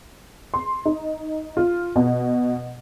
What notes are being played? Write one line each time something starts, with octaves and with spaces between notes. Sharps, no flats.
C6
D#4
F4
B2